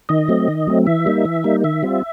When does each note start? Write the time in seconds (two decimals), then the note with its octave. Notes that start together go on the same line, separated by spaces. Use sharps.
0.09 D#3 D#5
0.28 F#3 A3 C4
0.48 D#3
0.67 F#3 A3 C4
0.86 E3 E5
1.05 G3 A#3 D#4
1.25 E3
1.44 G3 A#3 D#4
1.64 D#3 E5
1.83 G3 C4 F4